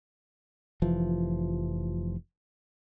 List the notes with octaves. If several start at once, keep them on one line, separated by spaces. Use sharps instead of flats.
F1 E3 F3